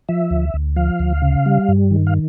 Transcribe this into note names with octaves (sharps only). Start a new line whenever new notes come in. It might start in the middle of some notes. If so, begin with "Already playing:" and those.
F3 E5
D2
D2
F3 F5
D2
C#3
G3
G2
D#3
F5